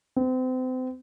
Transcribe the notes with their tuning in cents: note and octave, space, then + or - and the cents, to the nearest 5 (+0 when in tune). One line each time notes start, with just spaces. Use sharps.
C4 -35